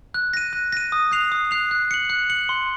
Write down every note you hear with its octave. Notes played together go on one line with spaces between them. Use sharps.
F#6
A#6 D#7
F#6
A#6 D#7
D#6
F#6 C7 F7
D#6
F#6 C7 F7
F#6
C#7 F#7
F#6
C#7 F#7
C6